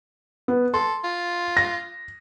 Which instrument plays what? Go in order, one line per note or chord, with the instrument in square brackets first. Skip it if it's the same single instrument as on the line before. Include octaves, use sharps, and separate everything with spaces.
[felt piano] B3
[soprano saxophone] A4 [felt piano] C6
[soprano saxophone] F4
[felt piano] A#6